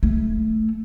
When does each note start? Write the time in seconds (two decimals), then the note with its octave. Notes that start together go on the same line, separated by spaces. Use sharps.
0.03 A3